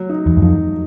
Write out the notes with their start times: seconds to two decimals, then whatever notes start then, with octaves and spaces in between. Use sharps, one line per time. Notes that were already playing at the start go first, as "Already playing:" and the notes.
Already playing: F#3
0.09 D#4
0.26 E2
0.37 F#2
0.42 F2 D#4